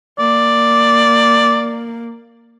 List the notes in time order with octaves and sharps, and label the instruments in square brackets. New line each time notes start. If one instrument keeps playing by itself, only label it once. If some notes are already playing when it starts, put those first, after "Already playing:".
[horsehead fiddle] A#3 [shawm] D5